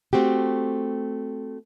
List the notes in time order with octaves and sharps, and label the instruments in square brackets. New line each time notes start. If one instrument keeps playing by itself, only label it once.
[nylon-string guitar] A3 C4 F#4 G4